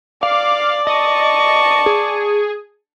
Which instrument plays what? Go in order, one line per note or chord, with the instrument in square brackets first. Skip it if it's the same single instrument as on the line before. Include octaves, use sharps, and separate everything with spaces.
[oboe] D5 [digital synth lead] F5 [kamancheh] D6
[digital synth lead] D#5 [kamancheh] A5 C#6
[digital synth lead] G#4